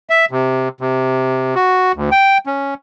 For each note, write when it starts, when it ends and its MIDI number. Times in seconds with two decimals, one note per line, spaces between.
0.10 0.25 76
0.31 0.69 48
0.81 1.55 48
1.55 1.92 66
1.95 2.10 38
2.11 2.38 79
2.47 2.74 61